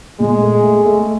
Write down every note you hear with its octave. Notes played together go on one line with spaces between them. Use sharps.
A#2 G#3
A3
A3
A3